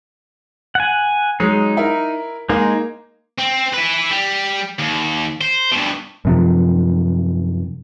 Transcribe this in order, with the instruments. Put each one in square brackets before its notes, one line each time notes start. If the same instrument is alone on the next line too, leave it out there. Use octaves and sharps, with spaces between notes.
[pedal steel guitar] F#5 G#5
[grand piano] F#3 G#3 [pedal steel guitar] D#4
[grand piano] E4 A#4
[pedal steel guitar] G#3 D#4 [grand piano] A#3
[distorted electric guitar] C4
E4 B4
G3
D#2
C5
G2 B2
[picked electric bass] F#2 C3 F3